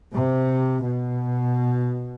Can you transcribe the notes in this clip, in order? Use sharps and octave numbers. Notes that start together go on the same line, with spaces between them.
C3
B2